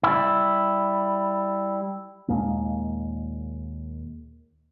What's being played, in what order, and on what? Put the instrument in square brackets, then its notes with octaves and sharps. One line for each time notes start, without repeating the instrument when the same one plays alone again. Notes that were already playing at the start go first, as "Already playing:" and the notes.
[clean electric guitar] G3 E4
[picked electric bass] D#2 A#2 G#3 A#3